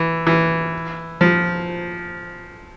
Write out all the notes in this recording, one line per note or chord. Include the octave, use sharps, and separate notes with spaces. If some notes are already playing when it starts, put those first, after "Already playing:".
Already playing: E3
E3
F3